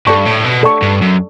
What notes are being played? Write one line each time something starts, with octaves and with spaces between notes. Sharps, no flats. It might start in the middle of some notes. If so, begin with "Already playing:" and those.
G2 A4 D5 A5 C#6
A2
B2
A4 D5 A5 C#6
G2
F#2